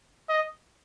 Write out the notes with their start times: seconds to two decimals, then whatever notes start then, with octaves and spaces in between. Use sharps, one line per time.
0.29 D#5